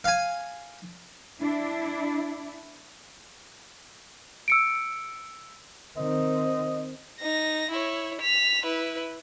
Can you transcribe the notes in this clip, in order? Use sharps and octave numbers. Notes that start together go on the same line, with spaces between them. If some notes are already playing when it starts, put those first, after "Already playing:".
F5 G#5
D4 E4
E6 C#7 D7
D#3 C4 D#5
D#4 A#6
E4 C#5
B6 F7
E4 B4